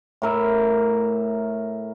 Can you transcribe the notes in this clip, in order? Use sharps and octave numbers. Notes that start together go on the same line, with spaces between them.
A2 A#4 E5